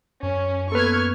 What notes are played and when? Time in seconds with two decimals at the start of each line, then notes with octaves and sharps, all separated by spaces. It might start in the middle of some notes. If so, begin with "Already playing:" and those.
0.23 F#2 C#4
0.72 A#3 B3 A4 B4 C#6 F6 G#6